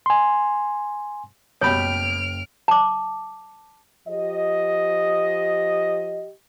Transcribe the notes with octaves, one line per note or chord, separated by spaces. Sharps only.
G#5 C6
F#1 B2 G3 C#5 G5 B5 F6 D7
A5 D6
F3 G4 D#5